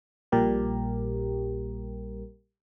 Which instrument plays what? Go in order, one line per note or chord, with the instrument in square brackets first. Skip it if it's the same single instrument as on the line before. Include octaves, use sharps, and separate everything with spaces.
[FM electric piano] A#1 A#2 G3 G4 A#4